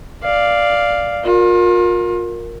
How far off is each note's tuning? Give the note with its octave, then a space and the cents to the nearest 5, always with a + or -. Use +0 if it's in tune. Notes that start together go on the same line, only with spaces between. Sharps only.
D5 +0 F5 +0
F4 +35 A#4 +0